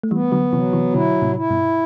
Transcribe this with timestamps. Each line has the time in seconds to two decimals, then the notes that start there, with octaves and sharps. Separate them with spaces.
0.03 A3
0.11 E3 G3 B3
0.32 D3 F#3
0.52 C3 E3 F#3
0.73 C3 E3
0.94 B2 D3 E4
1.22 A2 C3
1.36 E4
1.50 G2 B2